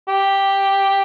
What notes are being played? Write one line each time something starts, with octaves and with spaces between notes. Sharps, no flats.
G4